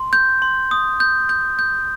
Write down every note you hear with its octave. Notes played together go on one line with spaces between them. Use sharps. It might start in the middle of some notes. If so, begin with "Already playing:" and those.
Already playing: C6
G6
C6
D#6
G6
G6
G6